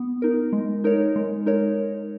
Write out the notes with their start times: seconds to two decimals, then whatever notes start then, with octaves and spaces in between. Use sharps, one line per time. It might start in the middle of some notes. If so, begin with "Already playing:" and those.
Already playing: B3
0.22 D#4 A#4
0.53 G#3
0.84 D#4 A#4 C#5
1.16 G#3
1.46 D#4 A#4 C#5